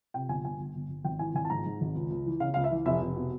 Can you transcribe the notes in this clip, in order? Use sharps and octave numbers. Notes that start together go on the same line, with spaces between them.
C3 G5
G1 G#5
G1 G#5
G1
G1
G1
G#1 G5
E3 G#5
G#1 G#5
A5
G#2 A#5
G#2
G#1
C#2
C#2
E3
C#3 F5
C#2 F5
E5
E3
F1 E5
F1
B2